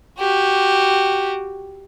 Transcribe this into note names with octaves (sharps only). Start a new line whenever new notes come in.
F#4 G4